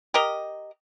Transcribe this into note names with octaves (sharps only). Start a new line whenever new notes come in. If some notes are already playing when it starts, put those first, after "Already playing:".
G4 A#4 D#5